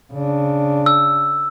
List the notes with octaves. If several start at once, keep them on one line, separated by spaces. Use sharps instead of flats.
C#3 D4
E6